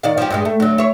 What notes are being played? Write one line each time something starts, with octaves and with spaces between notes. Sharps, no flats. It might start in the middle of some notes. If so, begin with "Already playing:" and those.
D#3 D5 F5
F3 G4
G2 G3 G#3
A3
D2 F#3
E4 C#5